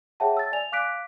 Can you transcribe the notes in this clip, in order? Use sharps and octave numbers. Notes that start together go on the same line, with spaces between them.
G#4 C#5 E5 F#5 G5 A5
E6 A6
D5 G#5 F7
F5 D6 F#6 B6 D7